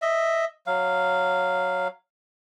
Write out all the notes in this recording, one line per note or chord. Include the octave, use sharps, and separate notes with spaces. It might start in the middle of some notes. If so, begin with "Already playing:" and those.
D#5 E5
F#3 F5